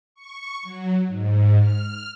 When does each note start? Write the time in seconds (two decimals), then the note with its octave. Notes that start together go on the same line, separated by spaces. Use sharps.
0.14 C#6
0.63 F#3
1.07 G#2
1.59 F6